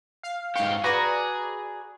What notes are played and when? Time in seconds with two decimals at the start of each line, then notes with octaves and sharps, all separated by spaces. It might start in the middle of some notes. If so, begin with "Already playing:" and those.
0.23 F5
0.56 G#2 G4 F5 C#6
0.84 F#4 G#4 B4 D5 A#5